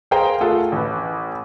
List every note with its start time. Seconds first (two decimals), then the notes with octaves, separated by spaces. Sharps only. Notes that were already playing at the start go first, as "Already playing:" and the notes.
0.11 G#4 A#4 C5 F5 G5 A#5
0.41 A3 F4 G#4 A4 F#5
0.72 A1 B4